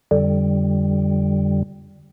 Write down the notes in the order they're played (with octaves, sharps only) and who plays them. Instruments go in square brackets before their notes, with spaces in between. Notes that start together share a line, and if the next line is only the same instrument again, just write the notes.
[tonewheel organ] F2 D3 G3